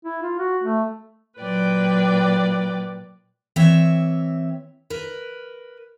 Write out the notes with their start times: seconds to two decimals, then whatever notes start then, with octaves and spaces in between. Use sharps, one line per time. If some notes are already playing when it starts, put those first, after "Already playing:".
0.05 E4
0.22 F4
0.39 F#4
0.63 A3
1.39 A#2 F#3 B4 D5 G5
3.56 E3 C4 C#5 E5
4.90 A#4 B4